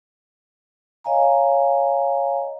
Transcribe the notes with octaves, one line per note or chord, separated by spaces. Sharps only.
C#5 D#5 F5 G#5 A#5